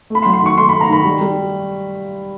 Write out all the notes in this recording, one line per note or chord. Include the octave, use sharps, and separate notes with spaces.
A3 B5
C6
F#3
C6
D#3 C#6
A3 C6
A3 B5
A#5
D#3 B5
G3
G3